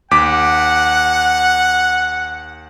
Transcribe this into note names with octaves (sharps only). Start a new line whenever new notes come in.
D#2 F#5 D6 B6